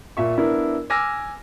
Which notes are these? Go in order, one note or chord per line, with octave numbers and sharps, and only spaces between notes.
A#2 E5 C#6
B3 D4 E4 A#4
G#5 D6 E6 F6 A#6